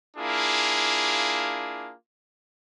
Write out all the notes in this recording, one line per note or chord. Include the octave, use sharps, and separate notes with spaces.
A#3 D4 E4 F4 G#4